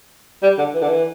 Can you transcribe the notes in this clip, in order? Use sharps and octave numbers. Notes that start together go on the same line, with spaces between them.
G3
D3
E3
D3
E3